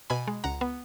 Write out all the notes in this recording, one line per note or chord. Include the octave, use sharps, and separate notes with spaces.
B2 G#5 B5
G#3
C#2 F#5 A#5
B3